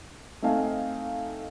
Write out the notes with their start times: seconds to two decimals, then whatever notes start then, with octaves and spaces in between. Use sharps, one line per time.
0.42 A3 C4 D#4 D#5 F5 G#5